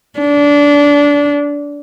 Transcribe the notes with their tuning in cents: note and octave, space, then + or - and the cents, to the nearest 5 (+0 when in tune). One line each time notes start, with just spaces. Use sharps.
D4 -20